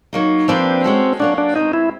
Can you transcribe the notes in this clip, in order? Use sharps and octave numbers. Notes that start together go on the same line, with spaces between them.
F#3 A#3 D#4
F3 A#3 C4 D4 G4 B4
G#3 C#4 F#4 A4
F#3 A#3 C#4 D4 F#4
D4
B2 G#3 C4 D#4
E4